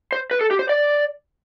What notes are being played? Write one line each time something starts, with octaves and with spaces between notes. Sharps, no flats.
C5
B4
A4
G4
C5
D5